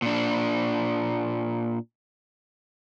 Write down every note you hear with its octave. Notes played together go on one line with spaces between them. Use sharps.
A#2 D4